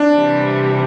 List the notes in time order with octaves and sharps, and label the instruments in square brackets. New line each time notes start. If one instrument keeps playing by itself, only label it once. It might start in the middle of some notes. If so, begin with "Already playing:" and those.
Already playing: [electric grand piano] D4
[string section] C3 E3 G3